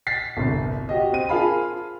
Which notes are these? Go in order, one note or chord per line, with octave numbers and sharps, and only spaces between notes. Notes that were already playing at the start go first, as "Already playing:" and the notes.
A6 B6 C7
G1 C2
F#4 G4 D#5
C4 D#7
F4 G#4 A#4 F5 A5 B5